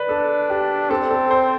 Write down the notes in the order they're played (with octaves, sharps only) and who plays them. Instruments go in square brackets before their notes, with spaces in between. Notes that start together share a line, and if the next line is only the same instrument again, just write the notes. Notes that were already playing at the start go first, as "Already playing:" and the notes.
Already playing: [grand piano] B4 D5
[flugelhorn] D4 [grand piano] A4
[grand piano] G4
[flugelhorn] C4 [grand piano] A4
[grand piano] A4
C5